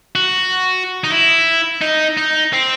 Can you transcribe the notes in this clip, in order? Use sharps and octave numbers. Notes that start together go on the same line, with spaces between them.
F#4
D#4
E4
D#4
D#4
C4